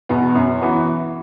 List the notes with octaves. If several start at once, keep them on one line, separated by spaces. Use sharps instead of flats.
E2 B2 B3
F#2
E3 B3 F#4